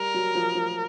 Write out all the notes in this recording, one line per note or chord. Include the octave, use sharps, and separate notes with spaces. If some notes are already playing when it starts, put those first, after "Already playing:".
Already playing: G3 A#4
F#3
F3
F3